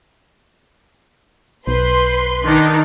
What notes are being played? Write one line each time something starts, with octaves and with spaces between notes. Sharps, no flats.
B1 B4 C5 C6
D#3 D4 D#4